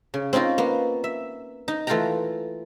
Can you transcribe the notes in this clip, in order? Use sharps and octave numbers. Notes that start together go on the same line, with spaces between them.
C#3
C4 C#4 D#4 F4 A#4
A#3 B3
E5
D#4
E3 A3 F4 A#4 G5 A#5